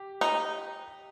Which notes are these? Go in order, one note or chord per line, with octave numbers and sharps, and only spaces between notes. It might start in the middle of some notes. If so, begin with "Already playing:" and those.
Already playing: G4
D#4